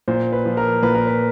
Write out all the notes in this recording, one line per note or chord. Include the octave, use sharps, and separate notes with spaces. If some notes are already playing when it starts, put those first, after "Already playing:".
A#2 C5
B4
F3
A#4
A#2 B4
A#4
B4